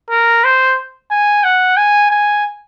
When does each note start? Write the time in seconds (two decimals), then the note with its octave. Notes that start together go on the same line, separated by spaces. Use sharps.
0.10 A#4
0.44 C5
1.11 G#5
1.44 F#5
1.77 G#5
2.10 G#5